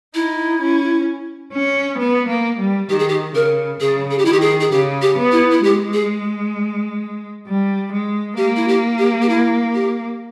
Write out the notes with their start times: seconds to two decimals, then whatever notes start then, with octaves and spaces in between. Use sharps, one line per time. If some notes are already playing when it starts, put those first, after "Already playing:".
0.15 D#4 E4
0.61 C#4
1.52 C#4
1.98 B3
2.27 A#3
2.58 G3
2.90 D#3 G4
2.99 G#4
3.08 G4
3.35 C#3 A#4
3.80 C#3 G#4
4.11 G#4
4.18 G4
4.25 D#3 E4
4.33 G4
4.41 G#4
4.61 G#4
4.71 C#3 G4
5.02 G4
5.17 B3
5.32 E4
5.52 E4
5.63 G#3 G4
5.93 G#4
7.46 G3
7.92 G#3
8.37 A#3 G4
8.56 E4
8.68 G4
8.99 G4
9.22 G4
9.29 E4
9.74 G4